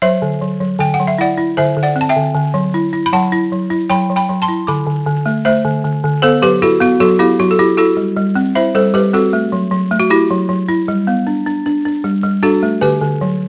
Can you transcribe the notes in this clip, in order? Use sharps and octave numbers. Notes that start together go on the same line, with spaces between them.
F#3 C5 E5
D3
F#3
F#3
D3 G5
F#5
F#3
E5
E4 D5 F#5
E4
D3 C5 E5
D3
D5 F#5
C4
A5
E5 G5
D3
D3
F#3
E4
E4
B5
F#3 F#5 A5
E4
F#3
E4
F#3 G5 B5
F#3
G5 B5
F#3
A5 C6
E4
D3 B5 D6
D3
D3
A3
A3 C5 E5
D3
D3
D3
B3 A4 C5
F#3 G4 B4
E4 F#4 A4
B3 F#4
F#3 F#4 A4
B3 E4 G4
F#3 F#4
A4
E4 G4
E4 F#4 A4
G3
G3
C4
E4 C5 E5
G3 A4 C5
G3 G4 B4
C4 F#4 A4
A3
F#3
F#3
A3
F#4
E4 G4
F#3
F#3
E4
G3
B3
D4
D4
D4
D4
G3
G3
D4 F#4 A4
A3
D3 G4 B4
D3
F#3